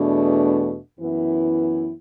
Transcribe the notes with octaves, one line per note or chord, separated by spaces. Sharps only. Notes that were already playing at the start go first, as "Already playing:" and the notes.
Already playing: E2 B2 A3 D4
F#2 E3 B3 E4